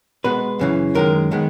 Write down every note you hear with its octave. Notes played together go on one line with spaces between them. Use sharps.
B2 G#3 B3 B4
F#2 C#3 E3
F#2 D#3 G#3 A#4
D#3 G#3 B3